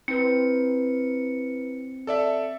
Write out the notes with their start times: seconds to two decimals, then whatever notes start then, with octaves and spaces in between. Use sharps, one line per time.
0.08 C4 E4 B4 C#7
2.07 A4 D5 E5